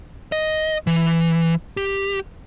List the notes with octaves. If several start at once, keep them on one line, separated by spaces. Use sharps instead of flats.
D#5
E3
G4